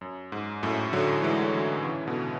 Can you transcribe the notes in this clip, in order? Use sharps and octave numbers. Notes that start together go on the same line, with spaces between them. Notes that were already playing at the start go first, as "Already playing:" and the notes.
F#2
G#2
F#2 A2
D3 F#3
E3 G#3
D3 F#3
C#3 E3
B2 D3